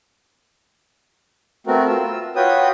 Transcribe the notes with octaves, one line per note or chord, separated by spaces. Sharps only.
A3 B3 C4 F#4 A#4
F4 E6
F4 F#4 B4 C#5 G5 D#6